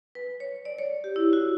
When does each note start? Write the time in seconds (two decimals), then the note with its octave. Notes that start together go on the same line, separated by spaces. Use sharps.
0.15 B4
0.40 C#5
0.65 D5
0.78 C#5
1.04 G4
1.16 E4
1.33 F#4